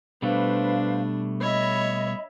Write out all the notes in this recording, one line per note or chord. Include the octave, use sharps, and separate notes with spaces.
B2 G3 A3 D4 B4 C5 F5
C#5 D#5 E5 B5